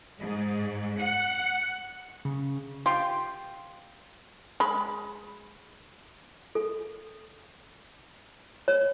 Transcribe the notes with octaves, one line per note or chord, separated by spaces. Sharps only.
G#2
F#5
C#3
F4 G4 G5 C6
G#3 B5
A4
C#5